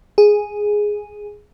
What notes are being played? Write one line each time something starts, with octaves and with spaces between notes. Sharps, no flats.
G#4